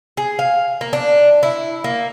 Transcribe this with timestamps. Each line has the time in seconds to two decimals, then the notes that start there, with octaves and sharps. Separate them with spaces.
0.17 G#4
0.39 F5
0.81 A#3
0.93 D4
1.43 E4
1.84 A#3